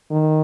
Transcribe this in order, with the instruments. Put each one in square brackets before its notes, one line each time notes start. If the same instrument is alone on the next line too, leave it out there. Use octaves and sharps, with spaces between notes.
[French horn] D#3